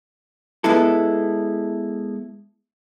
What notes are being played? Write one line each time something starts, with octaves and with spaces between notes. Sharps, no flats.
G#3 B3 E4 A4